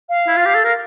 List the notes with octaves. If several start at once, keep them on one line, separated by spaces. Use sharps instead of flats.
F5
E4
F4
G4
A4
A#4